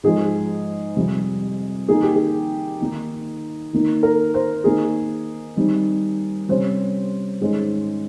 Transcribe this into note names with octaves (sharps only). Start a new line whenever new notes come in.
G#2 F3 G#3 G#4
F2 C3 G3
D#3 A#3 D#4 G#4
G4
G#4
D#3 A#3 D#4
D#3 A#3 D#4
A#4
C5
D#3 A#3 D#4 G#4
D#3 G3 C4 D#4
C3 G3 C#4 C5
G#2 D#3 G#3 C#4